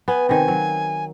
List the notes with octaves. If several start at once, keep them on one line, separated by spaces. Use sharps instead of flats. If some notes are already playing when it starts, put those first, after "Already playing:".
B3 G#5
C3 D#3 G#5
F#3